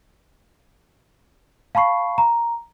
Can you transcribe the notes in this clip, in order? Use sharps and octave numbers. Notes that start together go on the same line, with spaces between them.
F5 A5 B5 C#6 C7
A#5